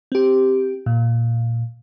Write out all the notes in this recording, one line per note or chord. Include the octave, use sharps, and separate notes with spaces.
C4 G4
A#2